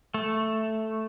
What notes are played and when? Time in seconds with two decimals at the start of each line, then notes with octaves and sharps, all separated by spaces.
0.14 A3